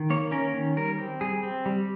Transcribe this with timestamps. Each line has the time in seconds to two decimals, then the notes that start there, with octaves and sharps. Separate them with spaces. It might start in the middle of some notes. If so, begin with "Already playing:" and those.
Already playing: D#3
0.10 A#3 C#5
0.31 C#4 A#4
0.54 D#3
0.77 G3 A#4
0.99 C4
1.21 G3 G#4
1.43 C4
1.66 G3